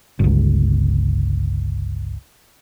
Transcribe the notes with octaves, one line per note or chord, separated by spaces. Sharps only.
G1 C#2